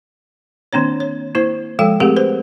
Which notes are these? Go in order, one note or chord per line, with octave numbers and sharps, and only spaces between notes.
D#3 A#3 C4 D4 C#5
C#5
A#3 E4 C5
F3 G#3 A4 G5
A3 C4 G4 G#4 A#4 F#5
B4 C5